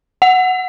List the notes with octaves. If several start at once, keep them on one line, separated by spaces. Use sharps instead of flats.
F#5